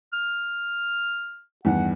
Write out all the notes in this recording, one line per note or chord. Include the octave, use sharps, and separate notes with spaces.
F6
E2 G2 D#3 F#5